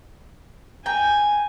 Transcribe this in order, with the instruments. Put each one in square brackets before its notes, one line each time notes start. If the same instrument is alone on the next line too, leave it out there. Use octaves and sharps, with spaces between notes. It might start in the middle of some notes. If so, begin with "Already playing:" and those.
[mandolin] G5 A#5 [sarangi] G#5